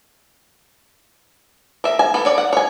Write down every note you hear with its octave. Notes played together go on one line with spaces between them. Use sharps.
A#4 E5
G#5
B3 A4
C#5 D5
F#5
C#5 G#5